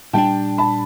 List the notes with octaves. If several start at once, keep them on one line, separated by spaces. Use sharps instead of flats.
A#2 G3 B3 D4 G5 A5
A5 B5